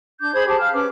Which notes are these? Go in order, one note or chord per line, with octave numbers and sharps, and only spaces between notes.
D4 D6 G6
G#4 C5 B5 G#6
G4 G#4 A5
F5 F6
C#4 B4 D6